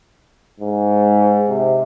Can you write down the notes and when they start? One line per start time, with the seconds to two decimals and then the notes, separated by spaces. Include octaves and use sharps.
0.60 G#2
1.49 C3